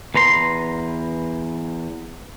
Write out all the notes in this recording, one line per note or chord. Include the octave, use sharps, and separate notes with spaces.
E2 B4 A#5 C6